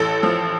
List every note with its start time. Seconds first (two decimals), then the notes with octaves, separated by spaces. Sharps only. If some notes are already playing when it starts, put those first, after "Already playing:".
Already playing: A1 A4
0.23 F3